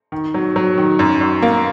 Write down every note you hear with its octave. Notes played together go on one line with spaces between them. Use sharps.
D#3
F#3
F#3
D#3
F#2
F#2
A#3